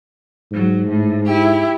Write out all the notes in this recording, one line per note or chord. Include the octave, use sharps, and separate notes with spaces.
G#2 F#3
A2
E4 G4